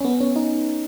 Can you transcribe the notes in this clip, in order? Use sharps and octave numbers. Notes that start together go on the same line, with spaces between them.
C#4
B3
C#4
D#4